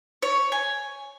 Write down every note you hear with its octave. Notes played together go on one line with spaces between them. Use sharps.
C#5
G#5